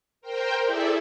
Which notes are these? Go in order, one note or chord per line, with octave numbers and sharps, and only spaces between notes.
A#4 C5 G5
E4 G#4 A4 D5 E5